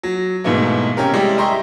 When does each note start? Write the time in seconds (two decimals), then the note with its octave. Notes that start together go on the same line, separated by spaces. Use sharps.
0.03 F#3
0.44 G#2 B2 E3 A3 A#3
0.97 C3 C#4 G4 A#4
1.13 G3 G#3 E4 G4 D5
1.37 D#5 E5 G5 A#5 C6 C#6